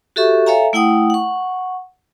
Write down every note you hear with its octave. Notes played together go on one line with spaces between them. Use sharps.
F#4 G4 A4 E5 C#6
A4 C#5 E5 F5 G#5 A#5
A3 E4 F#5 G5 D#6
F#5 C#6